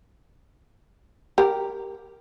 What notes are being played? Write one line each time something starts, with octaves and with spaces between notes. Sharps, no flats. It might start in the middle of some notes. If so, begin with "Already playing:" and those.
G4 A#4